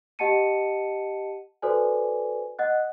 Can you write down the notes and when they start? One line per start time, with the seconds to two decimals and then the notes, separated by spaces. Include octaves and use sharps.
0.19 G4 D#5 F#5 A5 C#7 D#7
1.62 F#4 A4 B4 C5 D5 G#5
2.59 D#5 F#5 F#6